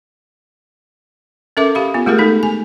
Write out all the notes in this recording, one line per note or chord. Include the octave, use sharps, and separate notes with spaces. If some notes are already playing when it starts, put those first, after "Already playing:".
C#4 A4 A#4 E5 D6
G4 F5 B5
B3 F4
G#3 A3 F4 G4 G#4 A#4
A3 D#4 A4
G#5